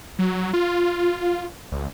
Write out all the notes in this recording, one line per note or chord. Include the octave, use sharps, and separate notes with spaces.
F#3
F4
C#2